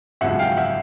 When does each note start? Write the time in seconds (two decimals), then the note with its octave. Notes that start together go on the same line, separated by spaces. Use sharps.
0.21 G#1 F#2 C#3 F3 G#3 E5 F#5
0.39 F5 G5
0.57 E5 F#5